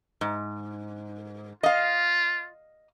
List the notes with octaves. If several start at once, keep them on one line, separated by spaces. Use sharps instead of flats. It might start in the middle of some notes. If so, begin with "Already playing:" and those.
G#2
F4 D#5 F5